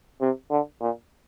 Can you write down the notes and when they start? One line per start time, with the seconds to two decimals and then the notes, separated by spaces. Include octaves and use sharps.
0.21 C3
0.50 D3
0.81 A#2